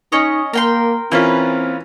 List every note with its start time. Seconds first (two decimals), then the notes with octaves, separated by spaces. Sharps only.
0.12 C#4 D#4 C#5 D#5
0.53 A#3 A#4 G5 C6
1.12 E3 A#3 C4 C#4 F4 B4